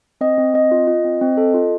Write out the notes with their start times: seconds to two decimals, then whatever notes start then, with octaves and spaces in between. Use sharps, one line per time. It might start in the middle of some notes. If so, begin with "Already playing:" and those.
0.21 C4 D#5
0.38 C4
0.54 C4 D#5
0.71 F4
0.87 F4
1.04 C4
1.21 C4
1.37 A4
1.54 F4